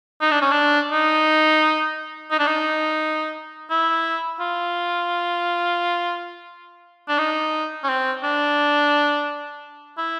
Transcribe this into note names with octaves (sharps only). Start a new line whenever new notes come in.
D#4
D4
C#4
D4
D#4
D#4
D4
D#4
E4
F4
D4
D#4
C#4
C4
D4
E4